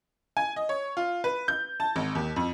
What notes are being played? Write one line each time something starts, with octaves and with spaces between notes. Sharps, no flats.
G#5
D#5
C#5
F4
B4
G6
A5
G#1
D#2
F2